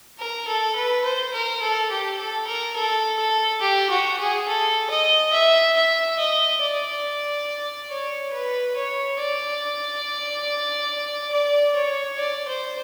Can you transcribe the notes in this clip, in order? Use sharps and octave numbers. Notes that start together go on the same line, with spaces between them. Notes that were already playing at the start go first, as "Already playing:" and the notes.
A#4
A4
B4
C5
A#4
A4
G4
A4
A#4
A4
A4
G4
F#4
G#4
A4
D#5
E5
E5
D#5
D5
C#5
B4
C#5
D5
D5
C#5
D5
C5